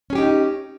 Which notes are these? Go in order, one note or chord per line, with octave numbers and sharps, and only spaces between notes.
C#4 D#4 G4 G#4